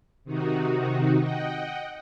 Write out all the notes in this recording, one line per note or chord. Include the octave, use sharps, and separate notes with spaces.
C3 D#3 D#4 F#4
D#5 F#5 G5